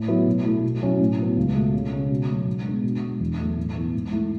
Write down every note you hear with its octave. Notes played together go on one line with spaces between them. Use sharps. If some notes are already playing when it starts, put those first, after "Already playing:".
Already playing: A2
F#3 B3 E4
B2
A3 E4
B2
F#3 C#4 E4
A2
F#3 B3
C#2
B2 A3
C#3
G#3 C#4
B2
F#3 A3
G#2
G#3 B3 D4
B2
G#3 D4
E2
B2 F#3 A3
A2
E3 B3
G#2
E3 A3 E4